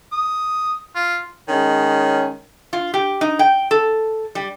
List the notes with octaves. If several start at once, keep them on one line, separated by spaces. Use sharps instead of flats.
D#6
F4
D#3 G#3 C#4
F4
G4
D#4
G5
A4
G3